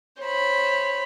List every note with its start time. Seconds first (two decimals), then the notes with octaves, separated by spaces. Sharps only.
0.21 C5 C#5 B5